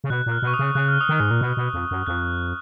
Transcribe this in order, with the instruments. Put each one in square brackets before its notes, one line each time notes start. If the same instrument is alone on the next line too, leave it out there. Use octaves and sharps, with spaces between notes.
[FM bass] C#3
[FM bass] B2 [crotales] F#6
[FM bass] A#2
[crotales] F6
[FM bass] B2 [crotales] C#6
[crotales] D#6
[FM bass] C#3
[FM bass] C#3 [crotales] F#6
[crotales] F6
D#6
[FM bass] D#3 [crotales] F6
[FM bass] G#2
A#2
B2
B2
F2
F#2
[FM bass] F2 [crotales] F#6